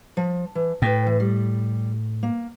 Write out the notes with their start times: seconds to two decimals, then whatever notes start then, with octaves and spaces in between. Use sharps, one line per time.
0.17 F3
0.55 E3
0.82 A2 B4 G5
1.07 E3
1.20 G3
2.23 A#3